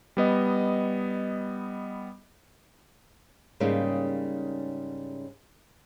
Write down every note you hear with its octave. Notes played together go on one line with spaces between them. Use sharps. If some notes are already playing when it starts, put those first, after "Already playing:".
G3 B3 D#5
G#2 C#3 G3 A#3 C#4 D#4